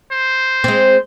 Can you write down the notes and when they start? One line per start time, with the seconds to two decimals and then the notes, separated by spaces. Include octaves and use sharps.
0.11 C5
0.64 G#3 C4